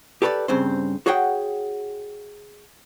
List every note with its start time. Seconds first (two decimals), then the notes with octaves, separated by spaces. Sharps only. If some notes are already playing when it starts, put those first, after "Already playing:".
0.22 G4 A4 B4 C#5 D5
0.48 G2 C#3 C4 C5
1.06 F#4 G#4 C#5 F#5 G5